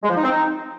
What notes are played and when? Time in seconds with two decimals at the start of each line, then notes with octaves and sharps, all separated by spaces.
0.03 G#3
0.10 F3
0.17 D#4
0.24 C4
0.30 D#4